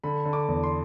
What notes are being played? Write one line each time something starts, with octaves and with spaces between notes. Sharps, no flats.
D3 B5
D3
D6
E2
C6